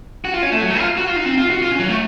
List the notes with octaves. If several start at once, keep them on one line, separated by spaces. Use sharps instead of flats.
F#4
F4
C#4
A3
F#3
A3
F4
F#4
F4
D#4
C4
F4
F#4
F4
C#4
F#3
A3